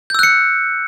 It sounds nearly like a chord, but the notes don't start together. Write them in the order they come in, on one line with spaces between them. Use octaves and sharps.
G6 E6 F#6 C#7